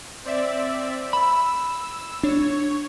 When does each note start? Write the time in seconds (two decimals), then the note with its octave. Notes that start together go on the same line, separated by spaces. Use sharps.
0.25 C4 D5 E5
1.13 B5 E6
2.23 D4 C#5